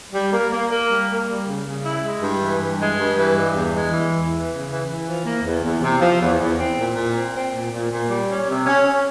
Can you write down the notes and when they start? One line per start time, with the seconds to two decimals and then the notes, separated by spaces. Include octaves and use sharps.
0.13 G3
0.31 A#3
0.51 A#3
0.70 A#3
0.89 G3
1.08 A#3
1.27 G3
1.45 C#3
1.65 C#3
1.83 E4
2.03 G#3
2.21 G2
2.40 E3
2.60 G2
2.79 G#3
2.97 G2
3.16 E3
3.35 G2
3.54 E2
3.73 G#3
3.92 E3
4.11 E2
4.30 E3
4.49 C#3
4.68 E3
4.86 E3
5.05 F3
5.24 A#3
5.43 E2
5.63 E2
5.81 C3
6.00 F3
6.19 E2
6.38 E2
6.57 C4
6.77 A#2
6.95 A#2
7.14 C4
7.33 C4
7.52 A#2
7.71 A#2
7.91 A#2
8.09 G3
8.28 C#4
8.47 C3
8.66 C#4
8.84 C#4